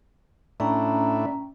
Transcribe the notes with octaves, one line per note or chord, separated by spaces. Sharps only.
A2 C#4 D4 E4 G5 A#5